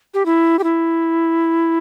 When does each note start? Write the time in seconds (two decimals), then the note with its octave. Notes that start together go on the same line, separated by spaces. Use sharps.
0.14 G4
0.26 E4
0.59 G4
0.64 E4